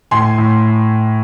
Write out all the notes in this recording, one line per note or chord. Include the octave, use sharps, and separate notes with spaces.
A2 G#5 C6
A2